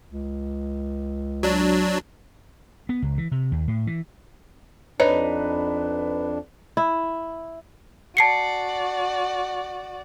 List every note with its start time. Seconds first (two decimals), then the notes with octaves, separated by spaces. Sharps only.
0.10 C#2
1.43 F#3 D4
2.89 B3
3.02 C#2
3.18 E3
3.32 C3
3.52 D#2
3.68 A2
3.87 E3
5.00 F2 D4 D#4 B4 C#5
6.77 E4
8.17 F#4 D5 A5 C7 C#7